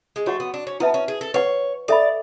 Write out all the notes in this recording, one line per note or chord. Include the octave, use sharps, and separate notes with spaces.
G#3
A3 F#4 C#5 F#5 C#6
B3
D4
C#4
B3 E4 B4 E5 A5
C#4
G#4
A4
B4 C#5 F#5 C#6
A4 D5 E5 B5